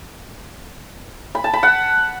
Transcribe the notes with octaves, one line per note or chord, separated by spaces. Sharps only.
B5
A5
B5
F#5